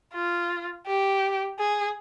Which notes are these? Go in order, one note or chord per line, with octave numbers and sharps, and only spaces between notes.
F4
G4
G#4